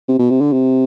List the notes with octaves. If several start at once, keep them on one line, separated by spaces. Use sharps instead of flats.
C3
B2
C3
D3
C3